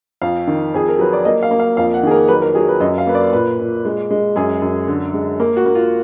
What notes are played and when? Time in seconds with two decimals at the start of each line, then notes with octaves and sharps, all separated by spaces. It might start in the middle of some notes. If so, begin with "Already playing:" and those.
0.22 F2 F5
0.47 D#3
0.74 F2 G#4
0.88 A#4
0.99 F#3 B4
1.13 D5
1.25 A#3 D#5
1.43 F5
1.51 A#3
1.60 F5
1.77 F2 F5
1.94 F#5
2.03 D#3 G#4
2.11 A#4
2.28 F#3 B4
2.42 A#4
2.55 F#3 G#4
2.68 B4
2.80 F#2 D#5
2.98 F5
3.07 A#3 B4
3.15 D5
3.33 A#2 B4
3.59 A#2
3.85 G#3
4.11 G#3
4.36 F#2 G#4
4.62 F#2
4.88 D3
5.14 G#3
5.40 A#3
5.57 F#4
5.66 A#3
5.75 F4